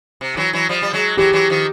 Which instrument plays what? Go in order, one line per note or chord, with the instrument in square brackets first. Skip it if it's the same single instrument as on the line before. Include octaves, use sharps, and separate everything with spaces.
[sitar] C3
E3 F#3
E3 F#3
F3 G3
G3
F#3 G#3
[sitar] E3 F#3 [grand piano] G4
[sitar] E3 F#3
D#3 F3